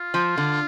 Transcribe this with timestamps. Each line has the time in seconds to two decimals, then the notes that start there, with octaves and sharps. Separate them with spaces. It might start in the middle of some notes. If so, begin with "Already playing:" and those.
Already playing: F4
0.14 F3
0.37 D3